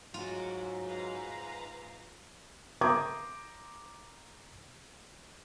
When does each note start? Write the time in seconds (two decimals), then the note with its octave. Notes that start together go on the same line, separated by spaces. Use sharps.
0.14 G#2 F#3 F4 F#4 D6
0.86 B4 F5 A#5
2.81 A#5 C6 D6 D#6 G6 G#6